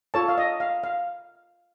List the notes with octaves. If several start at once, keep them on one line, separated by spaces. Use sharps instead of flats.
F4 A4 C#5 A5
F5
D#5
F5
F5